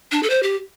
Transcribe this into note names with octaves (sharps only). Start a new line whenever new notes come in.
D4
A4
C5
G4